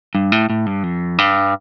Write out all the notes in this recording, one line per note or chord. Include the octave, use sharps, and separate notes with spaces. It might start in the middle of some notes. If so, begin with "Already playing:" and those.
G2
A2
A2
G2
F2
G2